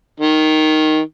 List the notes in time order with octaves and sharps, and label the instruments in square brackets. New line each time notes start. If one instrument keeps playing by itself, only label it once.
[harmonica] D#3